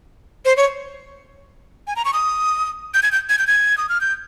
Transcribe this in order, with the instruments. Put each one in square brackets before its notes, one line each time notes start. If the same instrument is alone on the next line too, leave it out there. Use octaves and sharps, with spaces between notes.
[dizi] C5
C#5
G#5
A#5
C#6
D#6
G6
G#6
G6
G#6
G6
G#6
D#6
F6
G6